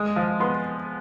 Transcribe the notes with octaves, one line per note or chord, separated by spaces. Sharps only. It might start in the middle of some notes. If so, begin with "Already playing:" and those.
Already playing: G#3 D#6
F3
B3 C6